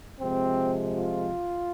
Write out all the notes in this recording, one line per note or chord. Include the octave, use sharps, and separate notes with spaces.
C3 F3 G#3 C4
F4